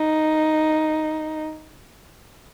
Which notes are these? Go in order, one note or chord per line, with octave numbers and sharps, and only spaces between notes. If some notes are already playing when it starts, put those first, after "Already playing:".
Already playing: D#4